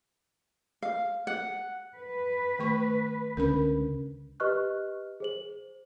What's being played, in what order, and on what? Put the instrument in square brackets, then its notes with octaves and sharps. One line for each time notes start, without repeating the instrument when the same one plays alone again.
[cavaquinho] F5
F#5
[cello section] B4
[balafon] D#3 A3 C#6
[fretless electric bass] C#2 D3 C#4 [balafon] A#4 B5
[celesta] G4 B4 D#5 C#6 F6 F#6
G#4 C5 F#7